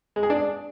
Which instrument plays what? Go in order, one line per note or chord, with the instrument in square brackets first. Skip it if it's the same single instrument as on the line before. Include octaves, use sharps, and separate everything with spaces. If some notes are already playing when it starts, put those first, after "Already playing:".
[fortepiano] G#3
G#4
D4